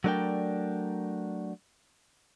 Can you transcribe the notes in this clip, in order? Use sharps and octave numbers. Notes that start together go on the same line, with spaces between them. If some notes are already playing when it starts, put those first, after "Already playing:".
F#3 A3 D4 A#4 D5 G5